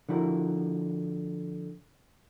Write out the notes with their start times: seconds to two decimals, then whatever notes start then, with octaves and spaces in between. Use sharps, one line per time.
0.09 D3 F3 E4 F#4 A#4